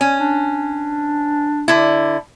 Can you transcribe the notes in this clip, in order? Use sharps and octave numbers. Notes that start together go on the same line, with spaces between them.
C#4 G#5
D4
D3 E4